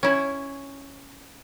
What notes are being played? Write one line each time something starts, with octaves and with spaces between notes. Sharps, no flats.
C#4 E4